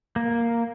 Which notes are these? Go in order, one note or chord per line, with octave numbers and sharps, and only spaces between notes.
A#3